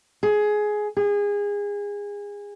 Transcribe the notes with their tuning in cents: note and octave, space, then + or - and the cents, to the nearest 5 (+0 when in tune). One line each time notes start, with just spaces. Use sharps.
G#4 +15
G#4 -25